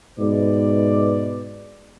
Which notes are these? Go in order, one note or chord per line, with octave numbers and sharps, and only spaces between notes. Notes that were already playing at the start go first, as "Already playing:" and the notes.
G#2 B2 B4 D5